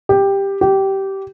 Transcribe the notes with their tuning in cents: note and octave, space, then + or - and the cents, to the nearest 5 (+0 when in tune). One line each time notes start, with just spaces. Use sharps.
G4 +10
G4 -15